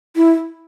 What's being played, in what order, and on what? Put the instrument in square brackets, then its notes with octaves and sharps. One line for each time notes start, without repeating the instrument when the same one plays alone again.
[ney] E4